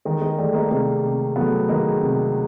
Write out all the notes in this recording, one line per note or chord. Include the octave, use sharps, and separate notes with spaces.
D#3 G#3
G#3
D#3 G3 A3
G#3 A#3
C3 G#3 A#3
C3
F#3 A3 B3
D#3 G#3 A#3
C3